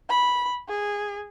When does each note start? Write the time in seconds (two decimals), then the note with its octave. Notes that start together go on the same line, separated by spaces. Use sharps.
0.10 B5
0.69 G#4